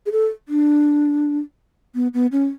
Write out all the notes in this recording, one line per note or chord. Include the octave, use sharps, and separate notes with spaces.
G#4
A4
D4
B3
B3
C#4